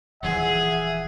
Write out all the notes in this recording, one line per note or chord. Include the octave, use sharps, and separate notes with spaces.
D#1 E3 F3 G#4 E5 F#5